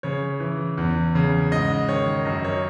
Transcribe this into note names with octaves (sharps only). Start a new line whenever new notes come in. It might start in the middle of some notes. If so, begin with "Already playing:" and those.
C#3 C#5
E3
E2
C#3
G#2 D#5
D#3 C#5
F#2 D#5
C#5